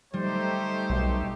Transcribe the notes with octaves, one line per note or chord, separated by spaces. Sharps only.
G3 A3 D#4 G4 C5
B1